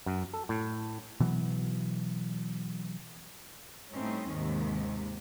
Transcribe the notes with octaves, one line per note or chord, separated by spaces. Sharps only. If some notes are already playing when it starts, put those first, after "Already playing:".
F#2
A4
A2
B2 E3 F#3
A2 G3 A3 C4 C#4 D#4
D#2 G#2 C3 D#3